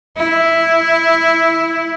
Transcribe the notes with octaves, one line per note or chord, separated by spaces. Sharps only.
E4